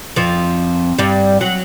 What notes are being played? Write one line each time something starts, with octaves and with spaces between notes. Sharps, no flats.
F2 F3
G2 G3
F#3